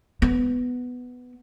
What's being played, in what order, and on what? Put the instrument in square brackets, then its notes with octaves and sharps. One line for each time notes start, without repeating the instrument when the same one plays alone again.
[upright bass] B3